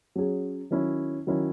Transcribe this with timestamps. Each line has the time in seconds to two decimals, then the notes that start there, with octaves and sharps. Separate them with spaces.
0.16 F#3 C#4 G#4
0.71 D#3 F#3 C#4 E4
1.27 D#3 F#3 C#4 E4